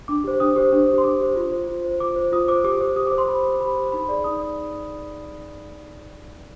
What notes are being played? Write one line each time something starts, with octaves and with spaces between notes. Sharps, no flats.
D4 D6
G4 C5
D4 D#6
G4 C5
D4
C5
G4 C6
D4 D6
G4 C5
F4 C6
C5
F4
C5
F4 D6
C5
F4 D#6
C5 D6
G4 D6
C5
G4 D#6
D6
C5
C6
G4 B5
C5
G4 B5
C5
D#4 B5
B5
G#4 D5
D#4 D#6